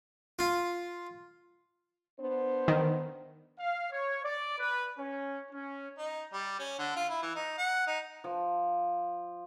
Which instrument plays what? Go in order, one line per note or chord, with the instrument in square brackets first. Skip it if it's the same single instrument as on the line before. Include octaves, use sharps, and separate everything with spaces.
[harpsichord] F4
[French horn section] B3 D4 C5
[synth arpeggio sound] D#3
[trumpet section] F5
C#5
D5
B4
C#4
C#4
[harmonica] D#4
G3
C#4
D3
F4
E4
E3
D#4
F#5
D#4
[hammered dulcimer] F3